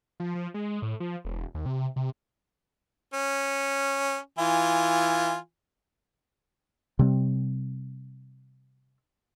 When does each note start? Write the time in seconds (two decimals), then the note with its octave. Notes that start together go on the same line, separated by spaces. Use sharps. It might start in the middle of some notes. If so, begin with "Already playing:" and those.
0.20 F3
0.35 F3
0.54 G#3
0.82 A2
1.00 F3
1.25 E1
1.55 D#2
1.66 C3
1.96 C3
3.14 C#4
4.38 E3 F4 G#5
6.99 C3 G3 C4